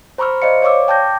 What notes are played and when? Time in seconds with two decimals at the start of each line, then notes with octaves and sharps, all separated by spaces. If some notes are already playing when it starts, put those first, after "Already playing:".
0.18 C5 A#5 B5 C#6 E6 F6
0.42 C5 D5 D#5 F5 C#7
0.62 C#5 D5 F5 C#6 D6 E6
0.88 G5 A5 D6 G6 A#6